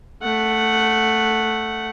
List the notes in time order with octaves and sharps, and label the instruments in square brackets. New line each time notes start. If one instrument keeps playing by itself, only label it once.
[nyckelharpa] A3 F#5